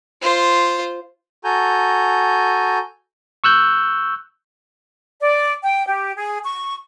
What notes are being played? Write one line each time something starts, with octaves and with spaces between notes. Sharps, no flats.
F4 C5
F#4 A4 G#5 A#5 G6
C#6 E6 F#6 G6
D5
G5
G4
G#4
C#6